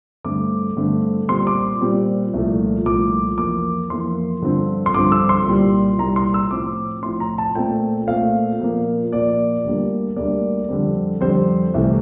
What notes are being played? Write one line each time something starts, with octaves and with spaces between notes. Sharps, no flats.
G2 D3 A3 C4 D6
G2 D3 A3 C4
A#2 G3 C4 C6
D6
A#2 G3 C4
C2 A#2 F3 A3
C2 A#2 F3 A3 D6
F2 E3 A#3 D6
F2 E3 A#3 C6
G2 D3 F3 C4
C6
G2 D3 F3 C4 D6
E6
C6
C2 A#2 G3
C2 A#2 G3 A#5
C6
E6
A2 F3 C4 D6
A2 F3 C4 C6
A#5
A5
A#2 A3 C4 G5
A#2 A3 C4 F5
A#2 F3 A#3
A#2 F3 A#3 D5
D2 D3 G3 A#3
D2 D3 G3 A#3 D5
F2 D3 G3 C4
F2 D3 G3 C4 C5
C2 C3 E3 A3